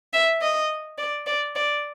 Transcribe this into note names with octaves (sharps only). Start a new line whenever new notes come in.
E5
D#5
D5
D5
D5